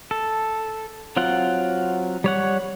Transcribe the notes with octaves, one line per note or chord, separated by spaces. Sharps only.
A4
F#3 C4 F4 F#5
G3 C#5 F#5